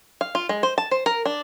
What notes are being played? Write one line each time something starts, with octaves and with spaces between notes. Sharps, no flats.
F5
F4
G#3
C5
A5
C5
A#4
D4